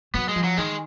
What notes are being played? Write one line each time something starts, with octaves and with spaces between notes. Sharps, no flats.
F#3 B3
G#3
F3
F#3
D#3 G#3